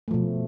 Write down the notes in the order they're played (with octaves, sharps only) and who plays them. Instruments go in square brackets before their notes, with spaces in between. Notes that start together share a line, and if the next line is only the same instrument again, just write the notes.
[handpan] A3
F3
B2